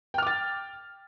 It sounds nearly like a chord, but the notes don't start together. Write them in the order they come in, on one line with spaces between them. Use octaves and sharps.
G5 F6 D6 A6